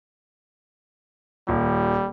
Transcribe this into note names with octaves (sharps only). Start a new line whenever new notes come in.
D#1 A#2 G3